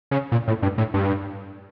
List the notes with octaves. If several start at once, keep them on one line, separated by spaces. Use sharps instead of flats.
C#3
A#2
A2
G2
A2
G2